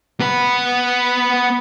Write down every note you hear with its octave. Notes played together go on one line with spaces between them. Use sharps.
B3 B4